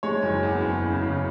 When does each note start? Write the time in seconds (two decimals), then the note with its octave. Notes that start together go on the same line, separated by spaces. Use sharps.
0.03 G#3 C#5
0.22 F#1
0.43 E2
0.62 F#1
0.82 C#3
1.01 C#3